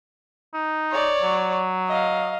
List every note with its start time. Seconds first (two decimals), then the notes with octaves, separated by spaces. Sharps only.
0.54 D#4
0.91 C#5 D5
1.22 F#3
1.88 D#5 F5